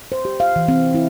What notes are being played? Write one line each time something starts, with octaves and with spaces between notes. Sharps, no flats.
C5
G4
F5
E3
C4
E4